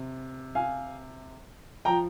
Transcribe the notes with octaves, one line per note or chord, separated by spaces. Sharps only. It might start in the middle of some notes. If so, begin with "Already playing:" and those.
Already playing: C3
F5 G#5
F3 G5 A#5